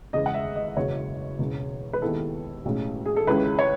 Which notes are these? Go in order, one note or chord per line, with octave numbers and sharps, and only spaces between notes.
E2 C#3 G#3 D#5
F#5
E5
D#5
F#1 E2 B2 G#3 C#5
E1 E2 C#3
B4
D#2 D#3 G#3 B3 E4 A4
B1 A2 G#3 C#4
G#4
A4
C#2 C#3 G#3 C#4 E4 B4
C#5